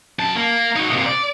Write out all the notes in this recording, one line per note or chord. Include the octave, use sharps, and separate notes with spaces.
F#2 A5
A#3
D#4 F#4
C3 A#3
D5